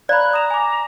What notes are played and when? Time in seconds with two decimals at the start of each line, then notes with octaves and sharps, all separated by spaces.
0.09 D5 F5 A#5 B5 F#6
0.33 A#5 D#6 E7 F7
0.50 G#5 D6